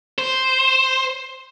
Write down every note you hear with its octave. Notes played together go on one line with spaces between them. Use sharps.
C5